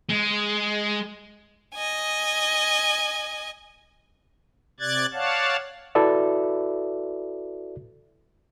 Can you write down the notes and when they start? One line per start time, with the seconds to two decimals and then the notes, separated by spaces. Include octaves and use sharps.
0.09 G#3
1.75 D#5 G#5
4.80 C3 D5 F#6 G#6 A6
5.13 C#5 D5 F5 F#5 A5
5.95 E4 F#4 A4 B4 D5 E5